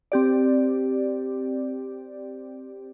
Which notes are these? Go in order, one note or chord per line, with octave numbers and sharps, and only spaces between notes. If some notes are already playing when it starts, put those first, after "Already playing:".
C4 G4 D5